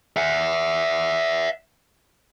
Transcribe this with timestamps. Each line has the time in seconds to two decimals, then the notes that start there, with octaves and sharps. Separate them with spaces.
0.16 E5 F#5